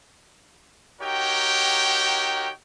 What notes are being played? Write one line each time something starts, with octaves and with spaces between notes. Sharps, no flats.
D#4 F#4 G4 A#4 C#5 G5